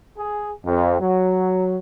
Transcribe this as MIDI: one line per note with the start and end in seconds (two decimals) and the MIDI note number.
0.18 0.50 68
0.66 0.99 41
1.01 1.78 54